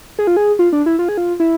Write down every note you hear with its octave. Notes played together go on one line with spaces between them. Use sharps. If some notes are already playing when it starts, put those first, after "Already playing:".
G#4
F4
G#4
F4
D4
E4
F4
G#4
F4
E4